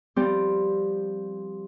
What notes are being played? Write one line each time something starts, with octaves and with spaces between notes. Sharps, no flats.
F3 G3 C4 G4